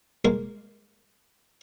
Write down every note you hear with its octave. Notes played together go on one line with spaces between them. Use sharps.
G#3 A#3 A#4